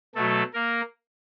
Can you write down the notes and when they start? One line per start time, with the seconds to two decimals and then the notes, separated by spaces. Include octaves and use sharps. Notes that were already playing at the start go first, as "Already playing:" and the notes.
0.15 B2 F#3 A3 A4
0.53 A#3 A#4